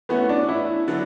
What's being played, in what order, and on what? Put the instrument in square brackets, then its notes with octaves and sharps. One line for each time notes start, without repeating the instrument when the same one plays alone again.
[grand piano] E3 A3 C#4 F#4 [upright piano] B3
[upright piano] D4
E4
[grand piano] D3 F#3 B3 D4